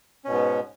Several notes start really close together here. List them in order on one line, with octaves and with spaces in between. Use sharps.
C#4 B2 G#2 B3